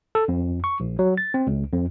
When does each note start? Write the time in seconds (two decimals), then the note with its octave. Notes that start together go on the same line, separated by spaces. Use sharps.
0.15 A4
0.28 F2
0.64 C#6
0.80 A#1
0.99 F#3
1.18 A6
1.34 C4
1.47 C#2
1.73 F2